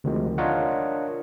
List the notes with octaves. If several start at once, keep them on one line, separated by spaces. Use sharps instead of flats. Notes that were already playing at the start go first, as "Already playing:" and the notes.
D2 C3 D#3 F3 G#3
D4 F4 A#4 C#5 D#5 F#5